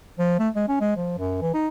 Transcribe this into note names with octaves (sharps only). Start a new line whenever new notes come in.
F3
A3
G#3
C#4
G#3
F3
F#2
E3
D#4